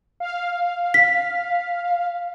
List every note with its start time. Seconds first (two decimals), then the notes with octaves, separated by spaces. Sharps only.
0.20 F5
0.94 B6